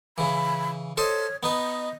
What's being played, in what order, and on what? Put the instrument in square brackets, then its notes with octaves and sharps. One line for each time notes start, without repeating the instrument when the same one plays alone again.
[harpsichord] C#3 E3 [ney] B5
[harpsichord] A4 C5 D#5 [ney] C#5
[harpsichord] B3 D#4 B4 [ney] D#5